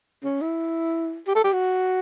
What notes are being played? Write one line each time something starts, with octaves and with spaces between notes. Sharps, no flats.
C#4
E4
G4
A4
G4
F#4